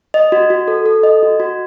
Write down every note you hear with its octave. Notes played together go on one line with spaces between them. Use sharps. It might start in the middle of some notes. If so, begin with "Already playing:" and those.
D#5
F#4
F#4
A4
A4
D#5
F#4
F#4